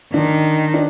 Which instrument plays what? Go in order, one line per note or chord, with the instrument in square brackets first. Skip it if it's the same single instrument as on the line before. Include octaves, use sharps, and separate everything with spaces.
[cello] D#3 [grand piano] D4
[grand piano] D4